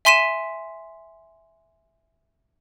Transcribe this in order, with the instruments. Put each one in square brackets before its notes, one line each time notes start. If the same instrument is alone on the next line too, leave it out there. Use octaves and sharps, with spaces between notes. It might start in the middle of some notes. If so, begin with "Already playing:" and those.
[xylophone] E5 G#5 C6 B6 D#7 E7